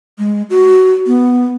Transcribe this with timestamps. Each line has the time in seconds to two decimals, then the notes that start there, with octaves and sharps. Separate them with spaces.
0.18 G#3
0.50 F#4
1.07 B3